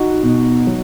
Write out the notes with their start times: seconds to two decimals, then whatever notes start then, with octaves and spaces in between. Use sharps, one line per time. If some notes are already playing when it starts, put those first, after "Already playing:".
Already playing: D#4 F#4
0.23 B2
0.67 F#3